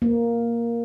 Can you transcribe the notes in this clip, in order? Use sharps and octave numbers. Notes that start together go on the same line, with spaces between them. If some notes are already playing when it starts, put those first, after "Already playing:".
A#3